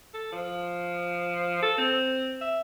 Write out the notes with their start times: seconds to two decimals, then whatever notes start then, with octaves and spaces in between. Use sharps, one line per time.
0.14 A4
0.32 F3
1.62 A4
1.78 C4
2.41 E5